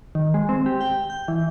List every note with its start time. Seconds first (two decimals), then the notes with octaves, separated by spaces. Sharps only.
0.15 D#3
0.34 G#3
0.49 C4
0.66 G4
0.81 G5
1.10 G6
1.28 E3